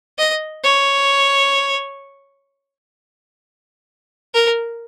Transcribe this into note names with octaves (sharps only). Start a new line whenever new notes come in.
D#5
C#5
A#4